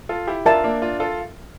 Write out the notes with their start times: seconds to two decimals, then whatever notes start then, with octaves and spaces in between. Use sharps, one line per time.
0.09 F4 A4
0.27 E4 G4
0.46 D4 F4 A#4 E5 A5
0.64 A#3 D4
0.82 D4 F4
1.00 F4 A4